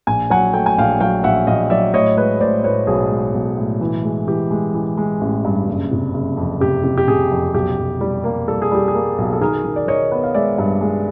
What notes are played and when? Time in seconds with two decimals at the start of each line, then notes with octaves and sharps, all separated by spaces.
0.07 A#1 G#5
0.30 F#3 F#5 G#5
0.53 A3 G5
0.66 G#5
0.77 A#1 F5 G5
1.00 F#3 F5 G5
1.24 A#1 E5 F#5
1.47 A#1 D#5 F5
1.70 F#3 D5 E5
1.94 A2 C#5 D#5
2.17 G#3 B4 C#5
2.41 A2 C5 D5
2.64 A2 B4 C#5
2.87 B1 G#4
3.11 G#3
3.34 B1
3.57 A2
3.81 E3
4.04 G#3
4.27 E3 G4
4.51 G#3
4.74 E3
4.97 G#3
5.21 A1
5.45 G2
5.67 F#1
5.91 C3
6.14 F#1
6.37 F2
6.61 C3 G4
6.84 C3
6.97 G4
7.08 C3 G#4
7.31 F2
7.54 B1 G4
7.77 B1
8.01 G3
8.24 A#3
8.48 G3 A4
8.62 G#4
8.72 G3 G4
8.88 G#4
8.95 A#3
9.18 B1
9.33 A4
9.41 D#3 G#4 A#4
9.65 D#3
9.76 D5
9.87 D#3 C#5 D#5
10.12 B3
10.24 F5
10.34 G#3 D5 E5
10.58 G2
10.81 G#3